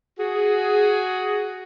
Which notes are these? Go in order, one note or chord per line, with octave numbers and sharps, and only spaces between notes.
F#4 G#4